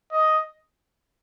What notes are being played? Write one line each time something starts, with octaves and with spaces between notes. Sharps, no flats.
D#5